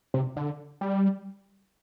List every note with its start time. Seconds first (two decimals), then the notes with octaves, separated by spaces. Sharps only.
0.14 C3
0.36 D3
0.81 G3